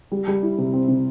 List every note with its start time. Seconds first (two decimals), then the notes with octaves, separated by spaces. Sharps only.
0.12 G3
0.27 G3
0.42 E4
0.58 C3
0.73 C4
0.88 C3